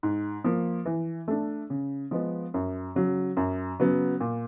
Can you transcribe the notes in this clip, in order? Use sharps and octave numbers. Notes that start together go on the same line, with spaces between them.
G#2
F3 A#3
E3
A3 D4
C#3
F3 G#3 B3
F#2
C#3 F#3
F#2
C#3 F#3 B3
A#2